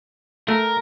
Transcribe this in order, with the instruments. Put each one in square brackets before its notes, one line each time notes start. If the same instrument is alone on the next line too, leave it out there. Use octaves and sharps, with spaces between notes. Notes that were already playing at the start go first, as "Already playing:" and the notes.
[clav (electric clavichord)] A3 [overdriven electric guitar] A#4